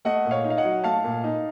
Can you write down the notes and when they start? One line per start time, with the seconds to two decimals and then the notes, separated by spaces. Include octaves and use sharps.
0.05 A3 D#5 F#5
0.25 A#2
0.31 C#5 F5
0.44 D#4
0.50 F5
0.57 D#5 F#5
0.64 F#3
0.84 A3 F5 A5
1.04 A#2
1.24 D#4